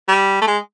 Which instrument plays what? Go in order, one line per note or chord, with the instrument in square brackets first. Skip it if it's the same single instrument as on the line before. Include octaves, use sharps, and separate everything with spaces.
[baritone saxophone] G3
A3
G#3